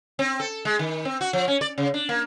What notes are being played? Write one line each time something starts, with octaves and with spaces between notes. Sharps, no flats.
C4
A4
G#3
D#3
C4
F#4
F3
C#4
D5
C#3
D4
A#3